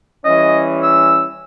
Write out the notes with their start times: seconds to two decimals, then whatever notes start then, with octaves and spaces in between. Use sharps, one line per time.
0.25 E3 G3 C#4 D#5
0.83 E6